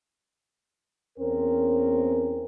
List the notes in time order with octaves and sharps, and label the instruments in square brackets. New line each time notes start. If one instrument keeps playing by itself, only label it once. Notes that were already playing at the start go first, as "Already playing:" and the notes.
[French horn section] E2 C4 C#4 A#4